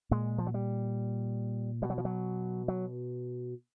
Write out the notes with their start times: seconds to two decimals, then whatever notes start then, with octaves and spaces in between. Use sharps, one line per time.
0.11 A#2 G#3
0.38 F3
0.47 F#3
0.54 G3
1.82 B2 G3
1.90 F#3
1.98 F3
2.05 F#3
2.68 F#3